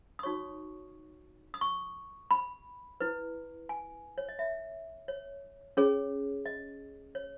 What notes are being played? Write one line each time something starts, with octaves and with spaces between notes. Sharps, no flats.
D#6
D#4 F#4 C#5 C#6
D#6
C#6
B5
E4 B4
G#5
C#5
D#5
E5
C#5
C#4 G#4 C#5
D#5
C#5